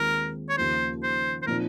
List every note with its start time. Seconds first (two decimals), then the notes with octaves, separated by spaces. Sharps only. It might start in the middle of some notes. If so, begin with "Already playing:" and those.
Already playing: D#2 D#3 G#3 C4 F4 A#4
0.49 C#5
0.57 D#2 C#3 F3 A#3 C5
1.03 C5
1.42 C5
1.46 A#2 F3 C4 D#4 A#4